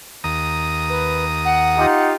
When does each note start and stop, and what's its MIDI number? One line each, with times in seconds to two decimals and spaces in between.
0.24 1.86 39
0.24 1.86 82
0.24 1.86 87
0.89 1.25 71
1.45 2.07 78
1.77 2.14 63
1.77 2.14 65
1.77 2.14 67